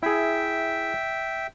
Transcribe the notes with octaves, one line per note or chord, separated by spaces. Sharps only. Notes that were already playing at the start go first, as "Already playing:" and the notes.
E4 G#4 E5 G5